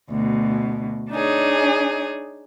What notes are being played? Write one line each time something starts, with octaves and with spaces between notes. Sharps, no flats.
D2 B2
D4 D#4 G#4 C#5